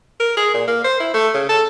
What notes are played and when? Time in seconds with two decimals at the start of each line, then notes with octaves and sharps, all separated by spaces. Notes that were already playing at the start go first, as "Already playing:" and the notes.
0.20 A#4
0.37 G#4
0.54 A#2
0.68 A#3
0.84 C5
1.00 E4
1.14 A3
1.34 C#3
1.49 A4